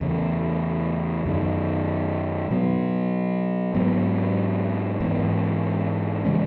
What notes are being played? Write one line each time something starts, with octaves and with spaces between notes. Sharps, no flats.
E2 C#3 E3
F#2 D#3 F#3
B2 F#3 B3
G#2 F#3 B3
G#2 E3 B3
C#3 E3 G#3 C#4